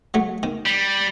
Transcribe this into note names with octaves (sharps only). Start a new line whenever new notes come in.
F#3 A3
D#3
G3